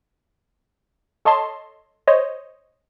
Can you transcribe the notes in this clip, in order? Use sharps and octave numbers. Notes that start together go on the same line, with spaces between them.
A4 C#5 D#5 A5 C6
C5 C#5 D#5